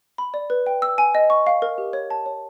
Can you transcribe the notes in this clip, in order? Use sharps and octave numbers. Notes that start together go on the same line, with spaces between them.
B5
D5
B4
G5
E6
G#5
D#5
C#6
F5
A#4
G4
C#5
A5
C#5